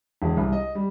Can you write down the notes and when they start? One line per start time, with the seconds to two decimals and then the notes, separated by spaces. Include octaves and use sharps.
0.22 E1
0.37 C2
0.53 D#5
0.75 G3